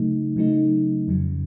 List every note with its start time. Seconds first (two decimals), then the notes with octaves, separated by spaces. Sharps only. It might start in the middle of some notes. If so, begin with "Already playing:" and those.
Already playing: C#3 F#3 A3 D#4
0.36 C#3 F#3 A3 D#4
1.08 F2 C#3 F#3